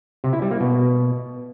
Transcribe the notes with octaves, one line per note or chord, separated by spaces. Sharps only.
C3
E4
G3
A#3
B2